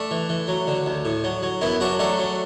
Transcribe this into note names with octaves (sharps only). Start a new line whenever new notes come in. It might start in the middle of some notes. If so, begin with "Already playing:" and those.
Already playing: A3 D4
E3
E3
F#3
D3
D2
A2
F#3
F#3
F#2 B3 E4
F#3 D4 F#4
F#3 A3 D4
F#3